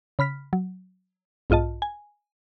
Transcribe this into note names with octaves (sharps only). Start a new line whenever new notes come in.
C#3 B5 F6 B6
F#3
B1 G#2 F4 D#5 A5
G#5